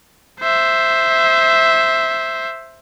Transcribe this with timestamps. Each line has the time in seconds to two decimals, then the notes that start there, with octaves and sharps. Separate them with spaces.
0.41 C5 E5